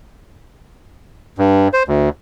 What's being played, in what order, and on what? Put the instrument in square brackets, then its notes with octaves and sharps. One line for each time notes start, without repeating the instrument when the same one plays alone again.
[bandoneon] G2
C5
D2